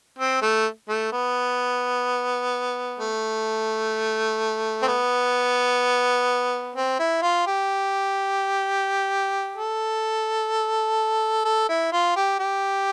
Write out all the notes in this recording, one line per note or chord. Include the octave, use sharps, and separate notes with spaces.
C4
A3
A3
B3
A3
C4
B3
C4
E4
F4
G4
A4
A4
E4
F4
G4
G4